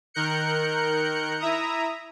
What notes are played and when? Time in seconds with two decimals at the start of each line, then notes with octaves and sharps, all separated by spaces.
0.14 D#3 A#4 F#6 G6 C#7
1.40 E4 E5 A#5 D#6